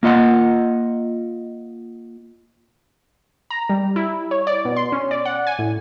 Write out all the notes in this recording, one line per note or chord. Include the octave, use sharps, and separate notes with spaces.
A#3 F4 D#5 F#5
A#5
G3
E4
C#5
D5
B2
C6
C#4
D5
F#5
G#5
A2